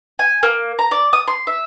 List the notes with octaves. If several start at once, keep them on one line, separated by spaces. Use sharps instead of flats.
G#5
A#3
A#5
D5
D#6
C6
E5